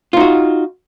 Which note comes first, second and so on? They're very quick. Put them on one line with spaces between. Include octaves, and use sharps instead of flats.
F4 D#4 F#4